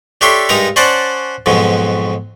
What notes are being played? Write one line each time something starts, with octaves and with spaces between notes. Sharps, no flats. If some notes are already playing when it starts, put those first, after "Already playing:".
D4 G4 A4 C#5 E5 C6
G2 G#3 D#4 A#4 A#5
C#4 C5 D5 F#5 A5
F2 G#2 B2 F#3